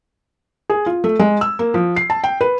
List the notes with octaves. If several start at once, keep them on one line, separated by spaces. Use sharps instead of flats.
G#4
F4
A3
G#3
E6
A#3
F3
C7
A5
G5
B4